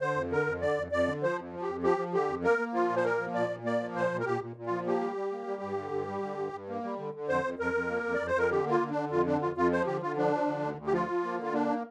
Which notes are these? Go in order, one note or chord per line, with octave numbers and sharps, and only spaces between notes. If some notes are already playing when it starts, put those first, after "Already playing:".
D3 C5
F2
D3 A#4
F2
D3 D5
F2
F2 D5
D3
F3 C5
F2
F3
G4
F2
F3 G4
F3
D3 G4
F2
A#3 A#4
A#3
F3 F4
A#2
C5
A#3 A#4
F3
A#2 D5
A#2
A#3 D5
F3
A#2 C5
A#2
A#4
A#2 G4
A#2
A#2
F3 F4
A#3 G4
G3
G3
A#3
G3
G2
D3
G2
G3
D3
G2
G2
A#3
G3
D3
D3
F2 C5
F2
F2 A#4
F2
A#3
F2
D5
F2
C5
F2 A#4
D3 G4
A#3
F4
D3
D4
D3
F2 F4
D3 D4
F2 F4
F2 F4
F3 C5
D3 G4
D3 F4
F3 D4
F3
D3
D2
D2
G4
F3 F4
F3
A#3
D3 F4
A#3 D4